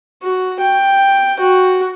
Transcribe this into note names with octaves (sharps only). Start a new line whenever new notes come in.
F#4
G5
F#4